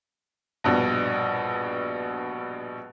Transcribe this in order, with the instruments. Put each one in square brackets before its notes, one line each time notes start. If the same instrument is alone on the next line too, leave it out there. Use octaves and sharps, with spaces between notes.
[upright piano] A#1 G2 B2